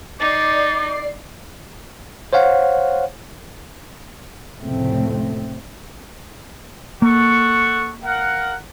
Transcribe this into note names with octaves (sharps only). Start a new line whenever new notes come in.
D#4 D5 D6 A6 C7
C5 C#5 F5 F#5
F1 C#2 A2 A3 C4
A#3 A4 F#5 C#6
A#4 F5 F#5